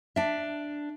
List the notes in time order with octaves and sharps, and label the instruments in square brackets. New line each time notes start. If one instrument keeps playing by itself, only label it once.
[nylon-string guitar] D4 E5